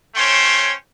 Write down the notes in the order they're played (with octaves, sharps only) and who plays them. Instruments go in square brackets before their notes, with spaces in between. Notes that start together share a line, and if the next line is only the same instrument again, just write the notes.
[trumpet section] A3 C#4 C5 C#5 G5 C6